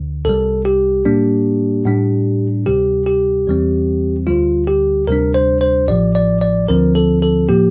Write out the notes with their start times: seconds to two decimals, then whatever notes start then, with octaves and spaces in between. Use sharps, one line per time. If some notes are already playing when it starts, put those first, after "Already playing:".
Already playing: D2 D3
0.25 C2 C3 G3 A4
0.65 G4
1.05 A2 G3 A#3 D4
1.86 A2 G3 D4
2.66 D2 C3 G3 G4
3.06 G4
3.47 E2 E3 G3 C4
4.27 D2 D3 G3 F4
4.67 G4
5.07 D2 C3 G3 D4 A#4
5.34 C5
5.61 C5
5.88 A1 A2 F3 D5
6.15 D5
6.41 D5
6.68 D2 D3 F3 C4 A#4
6.95 A4
7.22 A4
7.49 A2 F3 A#3 G4